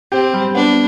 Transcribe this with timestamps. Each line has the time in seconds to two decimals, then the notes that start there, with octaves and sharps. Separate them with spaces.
0.12 C4 G4
0.33 G3
0.54 B3 D4